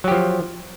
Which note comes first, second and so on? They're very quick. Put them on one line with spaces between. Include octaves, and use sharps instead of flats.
F#3 G4 F3